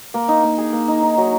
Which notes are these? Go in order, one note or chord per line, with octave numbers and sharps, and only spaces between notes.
A#3
D#4
A#3
G#4
A#3
D#4
D#4
F#3